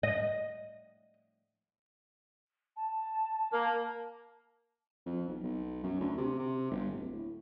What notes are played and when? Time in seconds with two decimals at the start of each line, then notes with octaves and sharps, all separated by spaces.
0.03 D#5
2.76 A5
3.53 A#3
5.06 F2
5.28 B1
5.44 B1
5.84 F#2
6.01 D2
6.18 C3
6.39 C3
6.71 G1
6.91 D1
7.13 A2